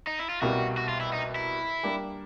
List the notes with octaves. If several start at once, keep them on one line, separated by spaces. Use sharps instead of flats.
D#4
E4
F4
C2 B2 G3 A#3 F#4
F#4
F4
E4
D#4
E4
G3 A#3 D4